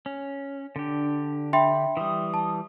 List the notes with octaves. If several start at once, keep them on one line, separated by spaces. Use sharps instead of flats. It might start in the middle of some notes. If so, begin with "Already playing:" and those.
C#4
D3 D4 G4
E5 G5 B5 C6
E3 G3 D#6
A5